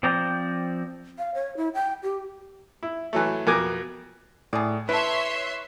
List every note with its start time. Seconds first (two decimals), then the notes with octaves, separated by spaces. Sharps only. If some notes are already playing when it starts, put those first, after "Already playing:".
0.03 F3 C4 D5 G5 A#5
1.18 F5
1.35 C#5
1.57 E4
1.74 G5
2.03 G4
2.83 E4
3.13 E3 F#3 A3
3.47 F2 B2 A#4 G#5 D6
4.53 A2 G#4 D5
4.89 E4 A4 B4 C#5 E5 C6